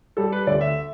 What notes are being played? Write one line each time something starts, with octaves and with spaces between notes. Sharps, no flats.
G3 A4
B4
D2 D5
E5